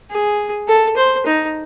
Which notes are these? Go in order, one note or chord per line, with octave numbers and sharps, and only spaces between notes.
G#4
A4
C5
D#4